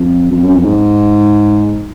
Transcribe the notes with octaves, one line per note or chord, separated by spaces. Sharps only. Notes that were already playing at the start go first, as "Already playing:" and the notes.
Already playing: F2
F2
F#2
F2
G#2